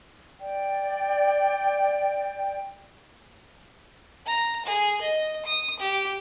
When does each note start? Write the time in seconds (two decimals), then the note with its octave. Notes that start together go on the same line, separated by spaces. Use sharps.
0.39 D5 G5
4.26 A#5
4.65 G#4
5.01 D#5
5.45 D#6
5.80 G4